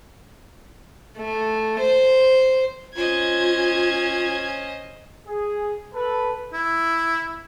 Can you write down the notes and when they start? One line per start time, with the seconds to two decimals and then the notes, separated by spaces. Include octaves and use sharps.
1.18 A3
1.80 C5
2.96 C#4 F4 C5 D#5 G#6
5.27 G#4
5.94 A4 B4
6.53 E4